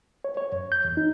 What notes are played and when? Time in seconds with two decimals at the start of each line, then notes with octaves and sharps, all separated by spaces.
0.24 C#5
0.37 C#5
0.52 F#2
0.72 G6
0.85 E2
0.97 D#4